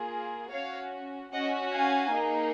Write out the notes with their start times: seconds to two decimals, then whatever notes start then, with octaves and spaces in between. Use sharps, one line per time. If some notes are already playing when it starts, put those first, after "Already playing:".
Already playing: A#3 F4 G#4
0.52 C#4 F#4 C#5 F5
1.32 C#4 F#4 D#5 F#5
1.72 F5 G#5
2.12 A#3 D#4 G#4